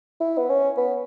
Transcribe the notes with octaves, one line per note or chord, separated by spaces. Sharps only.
E4
B3
C#4
B3